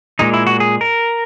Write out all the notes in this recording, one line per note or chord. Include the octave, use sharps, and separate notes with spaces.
A#2 G#3 D#4
E4
F#4
G#4
A#4